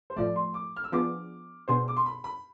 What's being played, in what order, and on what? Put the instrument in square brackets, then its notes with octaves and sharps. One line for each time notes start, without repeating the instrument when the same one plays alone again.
[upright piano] C5
[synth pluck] A2 F3 A3 [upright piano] D5
[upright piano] C6
D6
F6
E6
[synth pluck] F3 B3 D4 G#4 [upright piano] D6
[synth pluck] B2 B3 D4 G#4 C5 [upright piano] C6
[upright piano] D6
C6
B5
B5